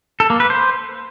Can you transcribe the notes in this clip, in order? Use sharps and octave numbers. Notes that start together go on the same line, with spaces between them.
A4
A#3
B4
C5